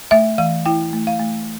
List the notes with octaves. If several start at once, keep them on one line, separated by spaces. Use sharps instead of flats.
A3 E5
E3 F5
E4 G5
A3
F5
A3